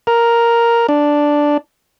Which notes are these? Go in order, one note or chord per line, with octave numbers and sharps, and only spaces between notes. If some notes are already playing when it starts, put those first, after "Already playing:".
A#4
D4